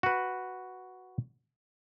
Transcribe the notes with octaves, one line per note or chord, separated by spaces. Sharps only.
F#4 B4